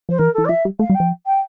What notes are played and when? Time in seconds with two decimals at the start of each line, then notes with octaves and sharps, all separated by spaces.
0.09 F3 C5
0.19 E3 A#4
0.34 E3 A4
0.45 D5
0.49 F3 E5
0.65 G3
0.79 A3 F5
0.90 G3
0.95 G5
1.00 F3
1.26 G5